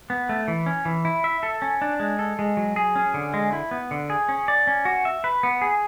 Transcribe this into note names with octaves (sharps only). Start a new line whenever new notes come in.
B3
A3
E3
C#4
E3
E4
E5
A4
C#4
D4
G#3
A4
G#3
F#3
G#4
C#4
D3
G#3
E4
B3
D3
G#4
C#4
D5
C#4
F#4
E5
B4
B3
G#4